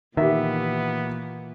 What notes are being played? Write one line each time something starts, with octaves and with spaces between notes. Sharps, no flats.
A#2 D#3 E3 B3 G4 E5